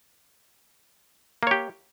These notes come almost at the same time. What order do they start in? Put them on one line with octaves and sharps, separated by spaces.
A#3 C#5 G4